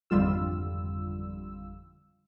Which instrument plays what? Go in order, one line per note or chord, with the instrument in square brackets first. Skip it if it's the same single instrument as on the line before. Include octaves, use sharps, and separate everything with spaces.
[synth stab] G#1 F2 D3 G3 F4 E6